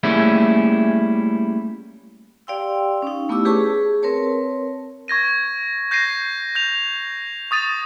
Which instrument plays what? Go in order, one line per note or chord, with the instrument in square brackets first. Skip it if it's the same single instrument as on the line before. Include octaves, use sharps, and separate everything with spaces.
[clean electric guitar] G3 A3 A#3 C#4 E4 G#4
[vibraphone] G4 D5 F5 G5 C6 E6
C#4 D#4
A3 B3 E4 G4 D6 E6
G4 G#4 B4 C#5 A5 C#6
G#4
C4 A#4 B4 C#5 A5
[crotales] C#6 G#6 A#6 D#7
G6 A#6 C7 D#7
G6 F7
C#6 D#6 A6 D#7